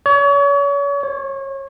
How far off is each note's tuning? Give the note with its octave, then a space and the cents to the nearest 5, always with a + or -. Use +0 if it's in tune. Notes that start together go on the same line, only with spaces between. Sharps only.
C#5 +35
C#5 -30